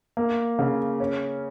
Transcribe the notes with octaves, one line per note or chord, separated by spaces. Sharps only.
A#3
C#3
C#4